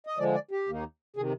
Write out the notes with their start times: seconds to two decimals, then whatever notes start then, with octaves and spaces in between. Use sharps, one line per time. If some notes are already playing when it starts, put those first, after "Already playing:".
0.07 D#5
0.18 D3 F3 G#3 D5
0.34 D5
0.51 G4
0.67 D#2 D#3 A#3 D#4
1.16 C3 D#3 G#4